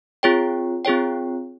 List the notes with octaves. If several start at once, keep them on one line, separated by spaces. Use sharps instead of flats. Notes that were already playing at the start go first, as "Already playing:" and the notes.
C4 F4 G#4 C#5 G5
C4 F4 G#4 C#5 G5